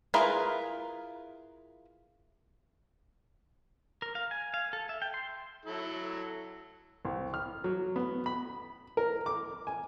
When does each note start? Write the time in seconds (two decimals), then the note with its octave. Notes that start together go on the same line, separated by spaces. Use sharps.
0.14 E4 F4 G#4 A#4 B4
4.02 A#4
4.15 F5
4.31 G#5
4.54 F5
4.73 A4
4.89 E5
5.02 G5
5.14 C6
5.65 F#3 E4 A4
7.05 C2
7.34 F6
7.64 F#3
7.96 B3
8.26 B5
8.97 A#4
9.26 D6
9.67 G#5